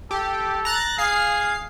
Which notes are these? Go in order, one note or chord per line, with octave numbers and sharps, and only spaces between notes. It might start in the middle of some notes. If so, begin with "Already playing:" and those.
G4 A4
A#5 F#6 A6
G#4 F5 C7